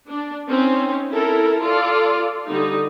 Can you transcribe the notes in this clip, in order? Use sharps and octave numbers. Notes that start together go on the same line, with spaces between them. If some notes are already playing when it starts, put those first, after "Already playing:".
D4
C4 C#4 D#4
E4 A4 A#4
F4 A4 D5
D3 G3 D#4